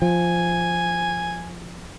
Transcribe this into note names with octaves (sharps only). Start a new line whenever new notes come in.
F3 G#5